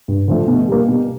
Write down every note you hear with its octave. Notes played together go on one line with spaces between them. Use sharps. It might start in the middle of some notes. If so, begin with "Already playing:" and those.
G2
D3 F3 A3
B2
G3 A#3
B2